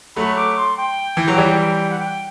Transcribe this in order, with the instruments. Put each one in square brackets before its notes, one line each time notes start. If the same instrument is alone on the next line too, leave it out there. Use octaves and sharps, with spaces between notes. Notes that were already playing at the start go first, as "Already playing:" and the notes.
[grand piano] F#3 A3 [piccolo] B5
[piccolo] D6
C6
G5
[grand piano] E3
F#3
E3 G3
[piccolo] F#5
G5